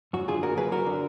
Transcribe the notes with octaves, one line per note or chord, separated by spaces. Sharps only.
F#2 F#4
D3 F4 G#4
A#3 F#4 A#4
F#3 G#4 B4
F#2 F#4 A#4
D3